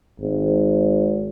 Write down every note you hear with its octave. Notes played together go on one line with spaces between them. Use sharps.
G#1